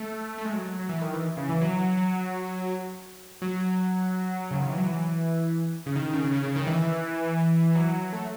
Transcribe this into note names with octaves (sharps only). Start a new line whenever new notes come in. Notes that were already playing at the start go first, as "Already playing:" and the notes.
Already playing: A3
A3
G#3
F#3
F#3
E3
D#3
E3
C#3
E3
F#3
F#3
F#3
C#3
D#3
E3
F#3
E3
C#3
D#3
C#3
C#3
C#3
D#3
E3
F#3
A3